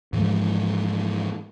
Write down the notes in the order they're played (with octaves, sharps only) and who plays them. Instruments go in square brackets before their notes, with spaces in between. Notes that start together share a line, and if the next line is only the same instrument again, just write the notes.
[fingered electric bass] G#2 E3 F3 G#3